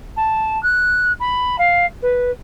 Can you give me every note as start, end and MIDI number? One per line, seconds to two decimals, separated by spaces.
0.16 0.61 81
0.63 1.12 90
1.20 1.56 83
1.58 1.85 77
2.02 2.30 71